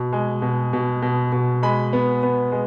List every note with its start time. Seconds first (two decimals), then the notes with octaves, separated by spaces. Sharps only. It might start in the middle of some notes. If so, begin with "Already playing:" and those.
Already playing: B2
0.13 G#3
0.42 B2
0.73 B2
1.02 B2
1.32 B2
1.63 G#3 B5
1.93 B3
2.23 B3
2.52 G#3